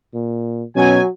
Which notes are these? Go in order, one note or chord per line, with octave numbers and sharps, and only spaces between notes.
A#2
B2 F#3 C#4 G#5